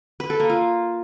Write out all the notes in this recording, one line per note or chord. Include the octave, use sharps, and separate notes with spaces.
B4
A4
A#3
F4